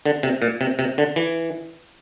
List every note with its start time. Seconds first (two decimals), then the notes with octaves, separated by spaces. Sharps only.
0.06 D3
0.23 C3
0.42 A#2
0.61 C3
0.79 C3
0.98 D3
1.16 E3